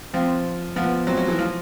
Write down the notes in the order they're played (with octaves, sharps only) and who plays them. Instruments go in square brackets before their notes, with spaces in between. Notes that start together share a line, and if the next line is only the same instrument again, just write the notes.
[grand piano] F3 [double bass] C4
[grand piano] F3 [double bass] B3
[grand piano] F#3 [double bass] C4
[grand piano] F#3
E3
F3